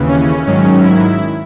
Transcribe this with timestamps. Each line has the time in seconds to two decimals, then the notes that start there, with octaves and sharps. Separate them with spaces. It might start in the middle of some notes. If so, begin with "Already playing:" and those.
Already playing: D#2 C#3 E3
0.08 C#4
0.46 G#2 D#3 F#3 C#4
0.84 E4